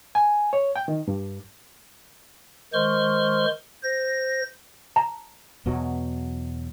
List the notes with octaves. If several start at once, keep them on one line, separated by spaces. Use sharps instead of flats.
G#5
C#5
G5
D#3
G2
D#3 G#3 C5 C6 C#6 F6
C5 A#6
A5 A#5
E2 B2 F#3